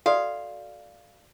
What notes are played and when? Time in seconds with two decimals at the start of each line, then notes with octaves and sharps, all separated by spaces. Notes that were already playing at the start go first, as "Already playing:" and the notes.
0.06 F#4 A4 D5 F5